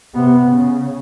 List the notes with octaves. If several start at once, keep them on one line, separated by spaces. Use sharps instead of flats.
C3 B3
C#3